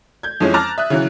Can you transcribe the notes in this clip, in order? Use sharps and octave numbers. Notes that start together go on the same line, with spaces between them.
G6 G#6
F2 E3 F3 G#3 C#4
A5 A#5 D6 F6 F#6 A6
E5 D#6 F#6
C#3 E3 F#3